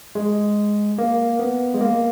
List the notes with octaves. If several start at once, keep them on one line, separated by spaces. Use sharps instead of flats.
G#3
A#3
B3
G#3
A#3